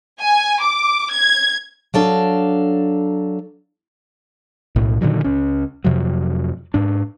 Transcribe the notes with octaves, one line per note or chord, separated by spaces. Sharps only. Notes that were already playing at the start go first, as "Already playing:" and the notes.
G#5
D6
G#6
F#3 D4 A4 F5
B1 A2
A#2 D3 D#3 F#3
C#2 C#4
F2 C3 F3 F#3
G#2 D4